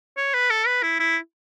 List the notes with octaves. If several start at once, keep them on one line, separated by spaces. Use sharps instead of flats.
C#5
B4
A4
B4
E4
E4